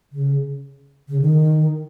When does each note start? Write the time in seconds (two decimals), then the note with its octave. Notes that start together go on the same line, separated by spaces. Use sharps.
0.12 C#3
1.09 C#3
1.22 D#3